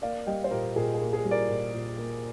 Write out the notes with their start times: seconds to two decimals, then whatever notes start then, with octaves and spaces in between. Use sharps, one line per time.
0.02 A#3 D5 F5
0.27 G3 D#5 G5
0.44 C5
0.51 A#2 G4 A#4
0.76 A#2 G#4
0.94 G#4
1.01 A#3
1.13 G#4
1.25 G3
1.31 A#4 D5
1.49 A#2
1.74 A#2
1.98 A#3